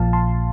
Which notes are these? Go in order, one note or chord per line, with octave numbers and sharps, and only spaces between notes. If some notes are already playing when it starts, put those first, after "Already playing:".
Already playing: A#1 A#2 F3 F5 A5
A5 C6